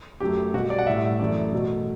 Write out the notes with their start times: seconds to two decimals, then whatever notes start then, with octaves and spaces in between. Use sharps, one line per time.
0.20 F#2 F#3 A3 G4
0.54 B2 G3 F#4
0.70 D5
0.79 F#5
0.87 A2 G3 E5
1.20 F#2 E3 A3 D5
1.53 B2 F#3 A3